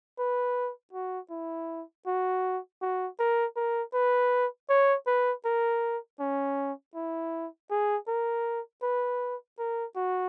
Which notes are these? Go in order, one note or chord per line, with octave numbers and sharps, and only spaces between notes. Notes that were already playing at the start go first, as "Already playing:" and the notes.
B4
F#4
E4
F#4
F#4
A#4
A#4
B4
C#5
B4
A#4
C#4
E4
G#4
A#4
B4
A#4
F#4